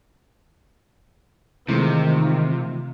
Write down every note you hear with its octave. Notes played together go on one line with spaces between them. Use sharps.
C3 D#3 E3 G#3 A3 F4